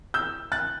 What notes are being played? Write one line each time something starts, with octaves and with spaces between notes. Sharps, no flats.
E6 G6
F#6 A6